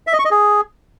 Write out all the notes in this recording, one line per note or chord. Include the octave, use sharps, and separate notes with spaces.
E5
D#5
C#6
D#5
G#4